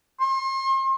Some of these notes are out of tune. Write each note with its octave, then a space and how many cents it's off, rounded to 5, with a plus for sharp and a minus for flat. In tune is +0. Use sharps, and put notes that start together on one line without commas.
C6 +40